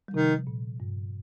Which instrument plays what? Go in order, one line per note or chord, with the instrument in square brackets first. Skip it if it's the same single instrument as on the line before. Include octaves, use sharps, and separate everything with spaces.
[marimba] G3
[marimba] C3 F3 [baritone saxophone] D#3
[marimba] A#2
G2